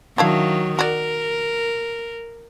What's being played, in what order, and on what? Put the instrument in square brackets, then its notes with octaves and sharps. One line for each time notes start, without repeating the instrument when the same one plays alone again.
[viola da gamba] D#3 F#3 [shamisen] D4 E4 F5
[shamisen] F#4 D5 [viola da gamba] A#4